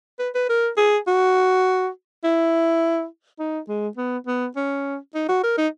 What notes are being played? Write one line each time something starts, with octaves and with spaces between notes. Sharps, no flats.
B4
B4
A#4
G#4
F#4
E4
D#4
G#3
B3
B3
C#4
D#4
F#4
A#4
D#4